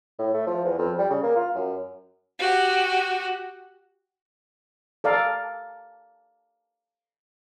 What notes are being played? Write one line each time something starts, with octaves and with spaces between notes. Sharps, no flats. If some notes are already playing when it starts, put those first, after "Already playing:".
A2
A3
F3
E2
F2
G3
C#3
A#3
F4
F#2
F#4 G4
A4 D5 F5 A#5